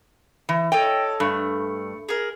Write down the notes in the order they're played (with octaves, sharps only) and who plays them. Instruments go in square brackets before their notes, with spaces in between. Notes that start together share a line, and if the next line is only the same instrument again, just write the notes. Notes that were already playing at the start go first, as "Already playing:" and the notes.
[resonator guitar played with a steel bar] E3
[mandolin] A4 C#5 D#5 [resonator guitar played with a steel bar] G5
[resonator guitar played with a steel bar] G2 [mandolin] A3
[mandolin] G#4 A#4